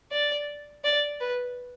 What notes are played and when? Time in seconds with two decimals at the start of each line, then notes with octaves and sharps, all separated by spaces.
0.12 D5
0.84 D5
1.21 B4